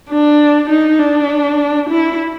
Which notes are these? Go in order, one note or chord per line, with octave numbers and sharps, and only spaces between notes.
D4
D#4
D4
E4